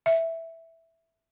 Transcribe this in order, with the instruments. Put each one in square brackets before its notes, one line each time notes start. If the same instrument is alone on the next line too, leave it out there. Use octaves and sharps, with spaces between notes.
[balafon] E5